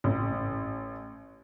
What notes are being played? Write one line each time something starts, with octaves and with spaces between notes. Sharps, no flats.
A1